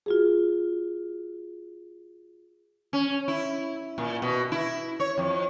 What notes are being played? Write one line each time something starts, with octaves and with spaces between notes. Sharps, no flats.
F4 F#4 G#4
C#4
E4
A#2
B2
E4
C#5
F2